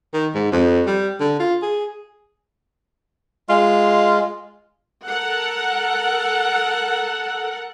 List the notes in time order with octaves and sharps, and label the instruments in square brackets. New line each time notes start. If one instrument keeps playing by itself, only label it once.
[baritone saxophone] D#3
G#2
F2
G3
D3
F4
G#4
[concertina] G#3 [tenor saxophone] F4
[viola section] A4 A#4 F#5